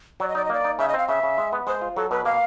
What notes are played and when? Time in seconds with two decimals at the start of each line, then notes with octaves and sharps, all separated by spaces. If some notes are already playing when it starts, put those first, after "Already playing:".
0.20 F#3 D5
0.29 D#5
0.35 D#4 D5
0.45 D#5
0.50 A#3 D5
0.64 D#4
0.79 C#3 E5
0.89 D#5
0.94 C4 F5
1.08 C#3 E5
1.23 C#3
1.38 G#3
1.53 B3
1.67 G#3 C5
1.81 F4
1.96 F#3 A4
2.11 B2 B4
2.25 A#3 F5